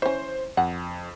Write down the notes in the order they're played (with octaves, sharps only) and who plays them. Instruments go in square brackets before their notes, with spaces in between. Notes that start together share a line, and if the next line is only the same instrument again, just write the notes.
[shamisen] E3 C#4 [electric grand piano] C5
[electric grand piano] F2 [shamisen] F#5